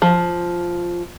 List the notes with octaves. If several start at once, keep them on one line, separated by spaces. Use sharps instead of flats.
F3